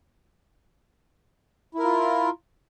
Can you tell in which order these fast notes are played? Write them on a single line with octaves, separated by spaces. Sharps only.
E4 A#4 F4